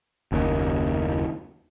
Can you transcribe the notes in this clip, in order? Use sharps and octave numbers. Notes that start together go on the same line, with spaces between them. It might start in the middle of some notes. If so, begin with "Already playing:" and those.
F#1 D#2